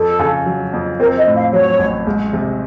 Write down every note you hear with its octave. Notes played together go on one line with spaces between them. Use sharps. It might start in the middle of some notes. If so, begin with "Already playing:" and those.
Already playing: F2 A4
C#3
F#3
F2
C4 A#4
D#5
A2
F5
F#3 C#5
A1
C#2
C3